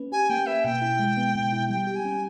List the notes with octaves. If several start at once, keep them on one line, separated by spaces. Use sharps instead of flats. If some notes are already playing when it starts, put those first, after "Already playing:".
Already playing: A#3 C#4 B4
G4 G#5
A#3 G5
B4 E5
B2 G5
E4
G#3
B3
B2
E4
G3 G5
G4
G#5
C#4